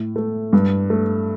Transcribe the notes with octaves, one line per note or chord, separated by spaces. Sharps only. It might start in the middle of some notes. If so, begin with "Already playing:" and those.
Already playing: A2
A3
G2
A3